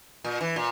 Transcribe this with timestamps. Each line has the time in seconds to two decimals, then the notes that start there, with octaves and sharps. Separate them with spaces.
0.24 A#2
0.41 E3
0.56 A#2